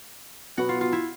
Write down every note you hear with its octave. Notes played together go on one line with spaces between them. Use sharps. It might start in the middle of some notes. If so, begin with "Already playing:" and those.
B2 F#3 B3 F#4
F4
F4
E4